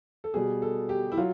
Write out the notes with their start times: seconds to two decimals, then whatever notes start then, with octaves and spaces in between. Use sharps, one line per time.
0.24 A4
0.34 B2 G3 G#4
0.62 A4
0.89 G4
1.12 E4
1.17 F#3 F4